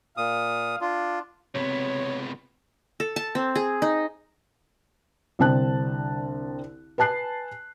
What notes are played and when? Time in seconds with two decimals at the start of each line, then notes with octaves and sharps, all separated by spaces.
0.17 A#2 F5 D#6
0.81 D4 F4
1.55 C#2 C3 B3 C#5
3.00 A4
3.16 A5
3.35 C4
3.55 G#4
3.82 D#4
5.39 C2 D3 C4 A5 F#6
6.98 B4 G#5 A5 F#6 C7